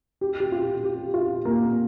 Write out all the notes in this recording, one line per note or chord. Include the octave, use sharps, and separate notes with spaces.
G4
G4
F4
G4
F4
A#3